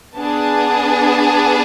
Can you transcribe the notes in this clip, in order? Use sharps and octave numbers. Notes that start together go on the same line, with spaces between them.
B3 D4 G#4 A5